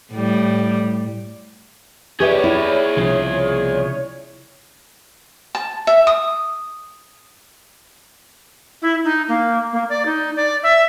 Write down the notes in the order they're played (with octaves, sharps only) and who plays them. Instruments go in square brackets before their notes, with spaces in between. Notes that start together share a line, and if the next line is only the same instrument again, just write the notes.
[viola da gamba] A2 G3
[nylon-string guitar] G4 B4 E5 [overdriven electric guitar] G#4 D5 [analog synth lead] C#5
[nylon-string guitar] E4
[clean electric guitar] C2 C#3 F3
[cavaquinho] A5
E5
D#6
[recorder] E4
D#4
A#3
A#3
D5
D#4
D5
E5